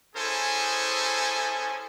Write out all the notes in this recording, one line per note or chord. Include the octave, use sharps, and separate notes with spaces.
C#4 E4 G#4 A4 C5 G#5